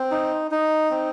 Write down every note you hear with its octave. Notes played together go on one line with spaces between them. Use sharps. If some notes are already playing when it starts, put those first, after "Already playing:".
Already playing: C4
D#4
D#4
C4